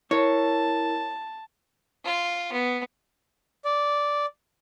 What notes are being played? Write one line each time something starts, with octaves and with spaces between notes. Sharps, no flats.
E4 A#4 C#5 A5
F4
B3
D5